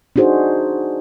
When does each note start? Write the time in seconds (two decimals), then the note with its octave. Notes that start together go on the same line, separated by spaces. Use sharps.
0.16 D4 D#4 F#4 G#4 C5